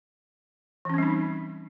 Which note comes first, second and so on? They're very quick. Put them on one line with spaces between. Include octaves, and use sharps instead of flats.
E3 C#4 C4 G3 D#4